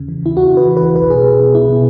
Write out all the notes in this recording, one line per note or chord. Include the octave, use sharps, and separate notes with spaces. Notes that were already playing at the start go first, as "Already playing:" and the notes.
Already playing: E2 C#3
E3
E2 E4
E2 F#4
C#3
B4
E3
E2 B4
B1 B4
B2 G#4
B1
B2
B1 E4
B2